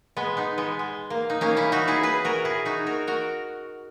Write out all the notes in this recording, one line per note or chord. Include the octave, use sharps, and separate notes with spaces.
G#3 B3
B3 D#4
G#3 B3
G#3
A#3
D#4
A#3 C#4
C#4 E4
D#4 F#4
E4 G#4
G#4 B4
F#4 A#4
E4 G#4
D#4 F#4
F#4 A#4
F#4 A#4